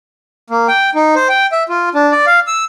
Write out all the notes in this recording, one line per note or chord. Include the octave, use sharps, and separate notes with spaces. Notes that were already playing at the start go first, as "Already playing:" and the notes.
A#3
G5
D#4
C5
G5
E5
F4
D4
D5
F5
E6